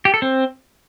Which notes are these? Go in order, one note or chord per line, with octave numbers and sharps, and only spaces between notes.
G4
A4
C4